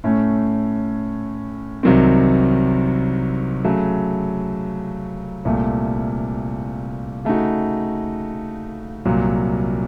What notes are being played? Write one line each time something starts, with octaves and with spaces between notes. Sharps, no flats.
A2 A3 C#4
C2 C3 D#3 F#3 C4
C#3 F#3 A3
C2 A#2 A3
C#3 A3 D#4 F#4
C2 A#2 F#3